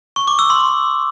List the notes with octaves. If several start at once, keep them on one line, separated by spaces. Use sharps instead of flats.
C#6
D6
E6
C6